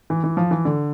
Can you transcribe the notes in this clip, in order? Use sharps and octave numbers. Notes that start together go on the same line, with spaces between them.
E3
E3
F3
E3
D3